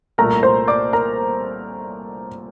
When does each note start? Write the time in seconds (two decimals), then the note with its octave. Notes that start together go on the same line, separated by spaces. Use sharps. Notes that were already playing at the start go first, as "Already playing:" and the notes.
0.18 C2 A#2 A3 A#4 A#5
0.43 C5 C6
0.68 D5 D6
0.93 A#4 A#5